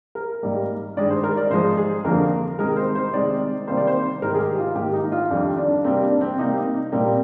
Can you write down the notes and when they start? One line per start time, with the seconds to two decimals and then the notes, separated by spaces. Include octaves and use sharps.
0.15 A#4
0.43 G#2 G3 A#3
0.96 G2 D#3 G#3 D5
1.10 C5
1.23 A#4
1.37 D5
1.50 G#2 F3 G#3 C5
1.77 G#4
2.04 F2 D3 F3 A#3 A#4
2.59 C3 D#3 G#3 A#4
2.77 C5
2.95 C5
3.13 C3 D#3 G#3 D5
3.67 C3 D#3 G3 A#3 C5
3.77 D5
3.87 C5
4.22 G#2 D#3 G3 A#4
4.35 G#4
4.40 G4
4.58 F4
4.75 G#2 D#3 A#3 G4
4.93 D#4
5.12 F4
5.30 F2 D#3 G3 D4
5.57 D4
5.84 C3 G3 A#3 C4
6.02 D4
6.21 C4
6.38 C3 G3 A#3 D#4
6.92 A#2 G3 A#3 C4